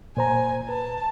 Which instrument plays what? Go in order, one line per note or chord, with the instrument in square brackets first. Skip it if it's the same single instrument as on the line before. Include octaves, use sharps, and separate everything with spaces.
[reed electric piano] A#2 C5 A#5 [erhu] G#5
[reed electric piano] B4 [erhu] A5